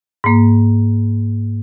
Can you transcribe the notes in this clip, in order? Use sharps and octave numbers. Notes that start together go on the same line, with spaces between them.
G#2 A#3